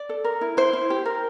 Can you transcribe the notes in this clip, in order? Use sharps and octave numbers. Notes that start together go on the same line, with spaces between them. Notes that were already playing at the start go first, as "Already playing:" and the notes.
Already playing: D5
A4
A#4
E4
E4 C5
E4
G4
A#4